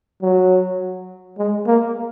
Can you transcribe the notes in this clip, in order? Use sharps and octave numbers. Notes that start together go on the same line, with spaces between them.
F#3
G#3
A#3